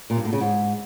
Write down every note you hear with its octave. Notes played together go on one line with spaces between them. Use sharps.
A#2
G2
A2
C#3
G#2